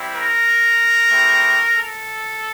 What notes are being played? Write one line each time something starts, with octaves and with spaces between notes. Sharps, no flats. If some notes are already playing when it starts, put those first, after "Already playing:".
Already playing: G3 C4 E4
A#4
A3 C4 E4 G4
A4